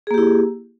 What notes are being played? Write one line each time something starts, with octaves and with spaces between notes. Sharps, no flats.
A#3 E4 G4 G#4